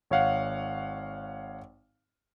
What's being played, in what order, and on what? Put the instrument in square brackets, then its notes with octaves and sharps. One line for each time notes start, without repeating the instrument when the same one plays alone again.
[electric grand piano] G#1 C#5 F5 F#5